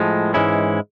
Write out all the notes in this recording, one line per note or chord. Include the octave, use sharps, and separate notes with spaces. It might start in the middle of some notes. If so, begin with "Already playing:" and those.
Already playing: A2 F3 G#3
G#2 E3 G#3 C#4 E4